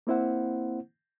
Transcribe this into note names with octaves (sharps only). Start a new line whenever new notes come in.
A#3 C4 E4 C5 F#5